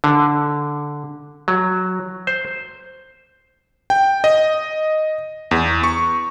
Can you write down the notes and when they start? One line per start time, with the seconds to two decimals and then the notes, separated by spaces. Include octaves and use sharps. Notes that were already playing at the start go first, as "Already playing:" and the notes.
0.04 D3
1.48 F#3
2.27 C5
3.90 G5
4.24 D#5
5.51 E2
5.84 C#6